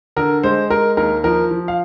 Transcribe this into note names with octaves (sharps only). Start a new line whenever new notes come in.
D3 A#4
G#3 C5
G#3 A#4
D#2 A#4
F3 A#4
F3
F5